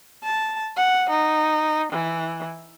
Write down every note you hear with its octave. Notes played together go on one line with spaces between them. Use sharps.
A5
F#5
D#4
E3